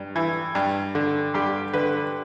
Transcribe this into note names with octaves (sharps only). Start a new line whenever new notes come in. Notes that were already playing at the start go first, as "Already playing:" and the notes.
Already playing: G2
E3
G2
D3
G2 G4
D3 B4